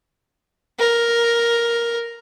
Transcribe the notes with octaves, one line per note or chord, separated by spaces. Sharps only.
A#4